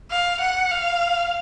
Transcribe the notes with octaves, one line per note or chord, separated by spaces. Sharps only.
F5
F#5
F5